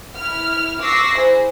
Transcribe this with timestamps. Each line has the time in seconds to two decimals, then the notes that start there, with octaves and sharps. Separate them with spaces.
0.16 E4 F6
0.80 C#6 D6 E6 F#6 A#6 C7
1.14 E4 G#4 C5